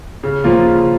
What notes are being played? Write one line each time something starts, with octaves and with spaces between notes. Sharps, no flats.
C#3
F3 A#3 F4
C#3